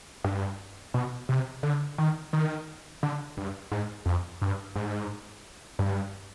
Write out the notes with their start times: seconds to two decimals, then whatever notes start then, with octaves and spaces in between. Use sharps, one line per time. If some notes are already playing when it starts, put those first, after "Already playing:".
0.24 G2
0.94 B2
1.29 C3
1.63 D3
1.98 D#3
2.33 D#3
3.03 D3
3.37 G2
3.72 G#2
4.06 F2
4.42 G2
4.76 G#2
5.79 G2